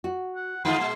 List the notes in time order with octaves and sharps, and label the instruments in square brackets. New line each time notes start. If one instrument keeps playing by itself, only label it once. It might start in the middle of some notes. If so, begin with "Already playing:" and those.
[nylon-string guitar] F#4
[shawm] F#5
[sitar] D3 G#3 F4 [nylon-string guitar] F#5 [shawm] C6
[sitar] A#2 G#3